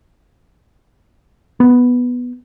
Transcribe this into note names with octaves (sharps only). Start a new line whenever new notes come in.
B3